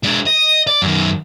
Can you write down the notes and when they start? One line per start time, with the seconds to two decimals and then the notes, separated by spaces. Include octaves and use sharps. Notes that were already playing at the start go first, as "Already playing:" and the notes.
0.04 G#3 D4
0.27 D#5
0.67 D5
0.82 F#2 D#3